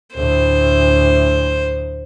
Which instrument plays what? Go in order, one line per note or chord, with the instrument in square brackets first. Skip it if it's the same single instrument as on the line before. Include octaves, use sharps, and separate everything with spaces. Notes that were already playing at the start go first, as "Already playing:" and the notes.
[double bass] D2 A2 [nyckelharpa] C5